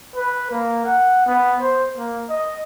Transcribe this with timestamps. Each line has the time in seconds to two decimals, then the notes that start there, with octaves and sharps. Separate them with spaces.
0.16 B4
0.52 A#3
0.85 F#5
1.27 B3
1.62 C5
1.98 A#3
2.29 D#5